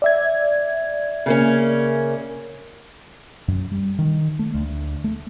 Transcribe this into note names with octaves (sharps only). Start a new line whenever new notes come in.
D5 E5 G#6
C#3 A#3 C#4
F#2
G3
D#3
A3
D2
A3